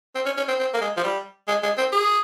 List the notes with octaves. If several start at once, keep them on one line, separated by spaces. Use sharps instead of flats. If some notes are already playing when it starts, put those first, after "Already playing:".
C4
C#4
C#4
C4
C4
A#3
G#3
F3
G3
G#3
G#3
C4
G#4